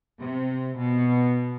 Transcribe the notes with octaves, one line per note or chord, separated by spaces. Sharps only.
C3
B2